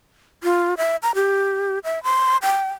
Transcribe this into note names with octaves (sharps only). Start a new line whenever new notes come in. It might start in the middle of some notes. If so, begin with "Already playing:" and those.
F4
E5
A#5
G4
E5
C6
G5